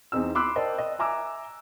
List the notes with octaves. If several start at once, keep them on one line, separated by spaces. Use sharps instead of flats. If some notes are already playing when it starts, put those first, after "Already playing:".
E2 C4 D#4 E6
B5 C6 D6 E6 F#6
A#4 C5 D5 D#5 G5 A5
D#5
E5 G#5 A#5 D6 E6